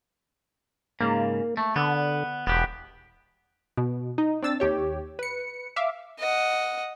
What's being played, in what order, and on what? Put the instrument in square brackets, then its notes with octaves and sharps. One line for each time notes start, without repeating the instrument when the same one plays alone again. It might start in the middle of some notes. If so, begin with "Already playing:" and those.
[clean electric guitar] G#2 C#3 [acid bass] A#3
[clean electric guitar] A3
[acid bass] D3 [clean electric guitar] B3
[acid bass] E1 [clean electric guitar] B3 G4
[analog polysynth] B2
D#4
C4 D4 E6 A6
D#2 G4 C#5
B4 C#7
E5 F5 D6
[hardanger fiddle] D#5 F#5